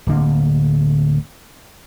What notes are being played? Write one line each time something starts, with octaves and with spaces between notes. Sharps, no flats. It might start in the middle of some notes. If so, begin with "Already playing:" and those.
D1 D3 A#3